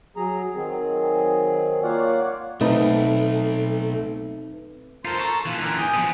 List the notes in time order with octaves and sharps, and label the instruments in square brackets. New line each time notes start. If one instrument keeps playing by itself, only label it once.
[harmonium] F#3 G#4 A#5
D#3 F#3 C4 G#4
A#3 F4 C#5 D5 F5 F#5
[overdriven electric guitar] B1 [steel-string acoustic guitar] A3 [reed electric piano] C4 D#4 B4
[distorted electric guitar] F4 A4 [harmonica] A#4 C5
[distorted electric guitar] A4 [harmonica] A5 A#5 C#6
[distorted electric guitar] A#2 E3 [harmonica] F4
[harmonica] D3 A#4
G#4 G5
[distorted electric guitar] F3 B3